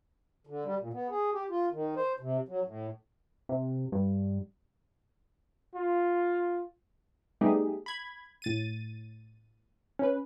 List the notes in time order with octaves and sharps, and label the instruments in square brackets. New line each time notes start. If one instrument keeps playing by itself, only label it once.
[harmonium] D3
G3
A#2
B3
G#4
G4
F4
D#3
C5
C3
F#3
A2
[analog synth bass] C3
G2
[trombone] F4
[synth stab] G3 A3 B3 D#4 G4 G#4
B5 G#6
A2 A6 D#7
C#4 B4